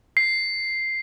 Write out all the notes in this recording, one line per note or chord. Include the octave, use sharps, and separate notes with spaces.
C7